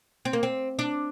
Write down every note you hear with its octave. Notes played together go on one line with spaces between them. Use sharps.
C4
A#3
C4
D4